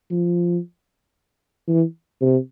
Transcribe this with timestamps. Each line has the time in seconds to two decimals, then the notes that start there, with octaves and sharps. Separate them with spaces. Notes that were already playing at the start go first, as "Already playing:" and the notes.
0.10 F3
1.68 E3
2.21 C3